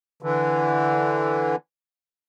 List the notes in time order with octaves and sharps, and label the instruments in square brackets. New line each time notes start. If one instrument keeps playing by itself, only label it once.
[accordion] D3 E3